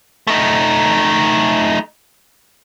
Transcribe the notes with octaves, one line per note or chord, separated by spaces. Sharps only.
A3 D#4